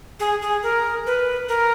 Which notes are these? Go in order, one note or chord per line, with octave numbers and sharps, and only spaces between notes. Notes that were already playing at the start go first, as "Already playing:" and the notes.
G#4
G#4
A#4
B4
A#4